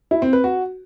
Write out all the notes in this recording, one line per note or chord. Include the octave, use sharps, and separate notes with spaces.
E4
C4
B4
F#4